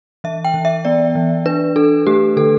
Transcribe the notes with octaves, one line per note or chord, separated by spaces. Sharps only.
E3 E5
G5
E3
E5
B3 D5
E3
D4 B4
D4 A4
A3 G4
D3 A4